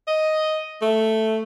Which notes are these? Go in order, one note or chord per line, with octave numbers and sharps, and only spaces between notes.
D#5
A3